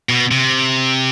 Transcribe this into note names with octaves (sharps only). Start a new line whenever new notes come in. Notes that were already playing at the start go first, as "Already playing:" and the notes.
B2
C3